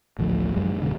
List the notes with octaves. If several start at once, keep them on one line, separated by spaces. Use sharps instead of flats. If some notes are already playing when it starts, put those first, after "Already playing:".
A1 D2 F3
F#2 F#3 G#3
D#1 B2 D3